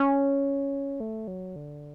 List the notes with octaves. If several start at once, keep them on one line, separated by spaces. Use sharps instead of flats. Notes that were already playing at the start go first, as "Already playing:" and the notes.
Already playing: C#4
A3
F#3
D3